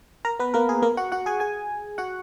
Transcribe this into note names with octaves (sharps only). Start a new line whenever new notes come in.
A#4 A#5
B3 B4
A#3 A#4
G#4
A#3 A#4
F#4 F#5
F#4 F#5
G#4 G#5
G#4 G#5
F#4 F#5